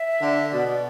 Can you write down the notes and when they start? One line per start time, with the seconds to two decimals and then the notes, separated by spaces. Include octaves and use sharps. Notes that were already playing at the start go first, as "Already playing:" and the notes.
Already playing: E5
0.21 D3
0.52 B2 D5
0.67 D5